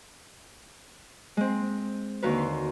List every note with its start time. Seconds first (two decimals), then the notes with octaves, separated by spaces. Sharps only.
1.37 G#3 C4
2.23 D#2 D3 F#4 A#4 B4
2.38 C6